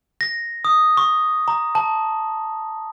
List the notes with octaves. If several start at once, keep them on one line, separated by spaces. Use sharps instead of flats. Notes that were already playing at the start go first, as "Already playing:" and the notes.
A#6
D#6
C#6
A#5
A5